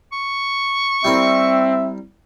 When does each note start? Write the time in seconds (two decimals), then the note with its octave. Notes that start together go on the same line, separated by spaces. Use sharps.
0.12 C#6
1.04 G3 C4 E4 A#4 E5